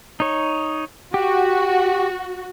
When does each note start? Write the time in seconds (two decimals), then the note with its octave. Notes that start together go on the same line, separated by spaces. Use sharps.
0.20 D#4 C#5
1.14 F#4 G4